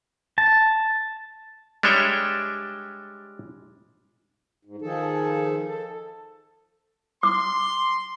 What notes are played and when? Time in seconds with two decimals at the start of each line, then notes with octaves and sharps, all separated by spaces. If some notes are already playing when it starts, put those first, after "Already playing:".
0.38 A5
1.83 G3 G#3 D4 C#5 E5 G5
4.65 G#2
4.82 D#3 F3 G#4 A4
5.67 A4
7.23 C6 D6